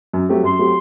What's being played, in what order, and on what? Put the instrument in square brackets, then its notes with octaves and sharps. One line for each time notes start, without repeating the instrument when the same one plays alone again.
[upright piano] F#2
F#3 A3 C4 G4
[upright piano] F#2 [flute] C6
[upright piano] F#3 A3 C4 G4